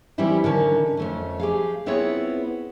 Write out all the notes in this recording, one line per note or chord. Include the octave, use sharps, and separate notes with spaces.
E3 G3 C4 C#4 E4 C5
D3 D#3 C#4 A5
F2 A3 C#4
G4 G#4 F5
B3 C4 E4 F4 G#4 C#5